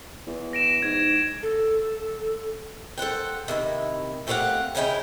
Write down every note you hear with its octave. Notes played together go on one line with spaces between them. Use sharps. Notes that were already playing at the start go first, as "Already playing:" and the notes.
E2
A#6 D7 E7
G#2 G#6
A4
A4 C5 F#5 G5
C3 D#3 E4
A3 C4 G4 C#5 F5 F#5
C#3 C#4 D#4 E4 F5 G5